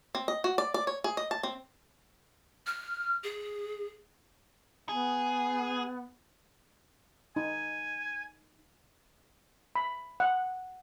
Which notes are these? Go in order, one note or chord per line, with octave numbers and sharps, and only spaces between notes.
C4
D#5
F#4
D5
D5
C#5
G#4
D#5
A5
C4
F6
G#4
B3 G#4
D#4 G#5
B5
F#5